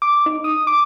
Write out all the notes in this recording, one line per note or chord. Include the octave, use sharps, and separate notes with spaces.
D6
D#4
D#6
D6